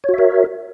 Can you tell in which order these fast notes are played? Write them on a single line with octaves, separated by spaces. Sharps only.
C#5 F#4 E5 A#4